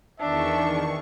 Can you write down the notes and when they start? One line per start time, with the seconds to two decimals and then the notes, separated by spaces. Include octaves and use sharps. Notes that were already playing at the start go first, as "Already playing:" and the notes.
0.20 E2 D#3 D4 E5 A5 C#6